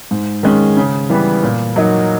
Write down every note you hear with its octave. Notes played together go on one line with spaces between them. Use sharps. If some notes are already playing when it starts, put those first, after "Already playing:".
G#2
D#3 G#3 C#4
C#3
E3 G3 B3
A#2
F#3 A#3 D#4 F#4